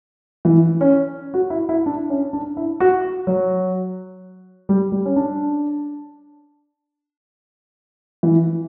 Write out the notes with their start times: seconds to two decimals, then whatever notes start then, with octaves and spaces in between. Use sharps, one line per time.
0.45 E3
0.81 C#4
1.34 F#4
1.50 E4
1.69 E4
1.86 D4
2.10 C#4
2.33 D4
2.57 E4
2.80 F#4
3.27 F#3
4.69 G3
4.92 G3
5.06 C#4
5.16 D4
8.23 E3